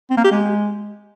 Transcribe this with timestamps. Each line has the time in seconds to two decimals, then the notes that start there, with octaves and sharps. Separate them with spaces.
0.10 C4
0.17 A#3
0.24 G4
0.31 G#3